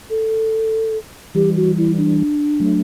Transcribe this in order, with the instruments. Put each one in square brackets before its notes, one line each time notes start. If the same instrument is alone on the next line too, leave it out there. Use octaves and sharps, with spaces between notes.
[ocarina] A4
[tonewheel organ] E3 G3 [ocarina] G4
[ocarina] F#4
E4
D4
[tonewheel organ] F#3 A3